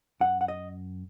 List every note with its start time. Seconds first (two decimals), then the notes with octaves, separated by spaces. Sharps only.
0.20 F#2 F#5
0.41 F#5
0.48 D#5